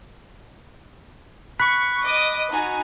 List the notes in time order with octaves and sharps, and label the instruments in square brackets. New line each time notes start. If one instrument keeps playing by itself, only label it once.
[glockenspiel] B5 F#6 B6 [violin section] C#6
[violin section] D#5 D6 D#6
D#4 F#4 G#5